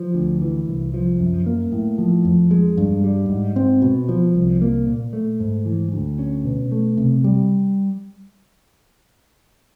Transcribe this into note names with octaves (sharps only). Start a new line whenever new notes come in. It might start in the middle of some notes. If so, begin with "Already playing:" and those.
Already playing: F3
D2
E3
C2
F3
F#2
A#3
A2
F3
F2
G#3
G2
G3
G#2
C4
B2
F3
C2
A#3
A#2
A3
G#2
E3
D2
C#4
B2
A3
C3
G3